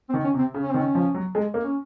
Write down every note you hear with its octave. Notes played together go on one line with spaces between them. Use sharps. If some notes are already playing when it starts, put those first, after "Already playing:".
C4
D#3
C#4
C3
C4
C#3
C#4
D#3 C4
C#4
F3
F#3
G#3
A#3
C#4